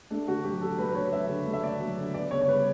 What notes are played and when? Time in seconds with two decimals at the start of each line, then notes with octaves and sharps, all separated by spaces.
0.11 A3 D4
0.28 D3 F#4
0.44 F#3 G4
0.61 D3 A4
0.78 A3 B4
0.89 B4
0.95 D3 C#5
1.13 F#3 E5
1.29 D3
1.46 A3
1.53 E5
1.63 D3 D5
1.80 F#3
1.97 D3
2.14 B3 D5
2.31 C#3 C#5
2.41 C#5
2.48 G3 B4